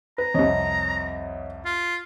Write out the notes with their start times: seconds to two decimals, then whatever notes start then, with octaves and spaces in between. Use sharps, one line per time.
0.18 B4 A#5
0.34 C2 F2 C#5 D#5
1.65 F4